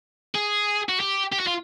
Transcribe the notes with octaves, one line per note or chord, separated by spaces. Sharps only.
G#4
F#4
G4
G4
F#4
F4